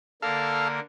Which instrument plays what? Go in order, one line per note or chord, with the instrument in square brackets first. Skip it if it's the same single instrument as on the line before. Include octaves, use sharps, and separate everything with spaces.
[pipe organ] D3 A#3 A#4 [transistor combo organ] A4 F5